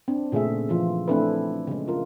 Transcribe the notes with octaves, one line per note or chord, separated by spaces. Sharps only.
C4 D4
A#2 C#3 A3 G#4 E5
E3 F3 F4
A3 C4 D4 E4 A4 B4
C#3 G#3
F4 A#4